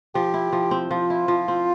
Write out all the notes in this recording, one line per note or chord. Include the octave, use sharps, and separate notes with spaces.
F3 G4
E4
F3
C4
F3 F4
E4
F3
C4